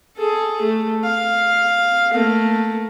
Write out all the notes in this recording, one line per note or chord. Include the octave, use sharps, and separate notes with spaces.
G#4 A4
A3
F5
A3 A#3